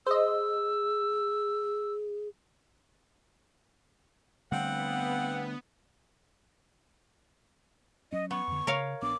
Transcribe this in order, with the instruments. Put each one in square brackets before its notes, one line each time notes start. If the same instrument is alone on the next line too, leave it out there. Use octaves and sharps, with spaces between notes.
[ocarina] G#4 [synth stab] C5 D#5 [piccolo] E6
[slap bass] D3 G3 A3 [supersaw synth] B3 [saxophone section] C4 F5 F#5
[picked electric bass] F#3 C#4 [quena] D#5
[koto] B3 [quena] C#6
[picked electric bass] F2 D3
[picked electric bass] C#3 [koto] A#4 C#5 F5
[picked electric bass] A#1 B3 D4 [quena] D6